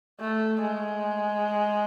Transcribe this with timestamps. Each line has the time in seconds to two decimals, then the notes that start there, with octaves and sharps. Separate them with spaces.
0.20 A3
0.60 G#3